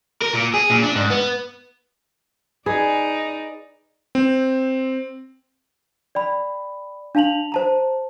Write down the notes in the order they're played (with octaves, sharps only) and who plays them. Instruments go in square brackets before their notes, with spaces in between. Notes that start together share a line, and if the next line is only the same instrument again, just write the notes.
[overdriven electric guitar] A#4
A#2
G#4
A#2
D4
G#2
B3
[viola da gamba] D#4 D5 [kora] G#4 B4
[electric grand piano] C4
[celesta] D5 G5 B5
D4 F5 A5 F7 F#7
C5 A5 A#5